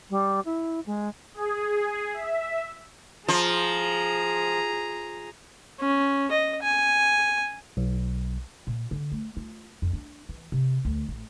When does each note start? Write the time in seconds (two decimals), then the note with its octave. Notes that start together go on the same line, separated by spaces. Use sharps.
0.10 G3
0.45 E4
0.86 G#3
1.34 G#4
2.14 E5
3.28 F3 G#4 A#5
5.80 C#4
6.31 D#5
6.63 G#5
7.77 B1
8.67 A#2
8.91 D3
9.12 A3
9.37 F4
9.82 F2
9.93 D4
10.29 E3
10.52 C3
10.85 D2
11.08 A1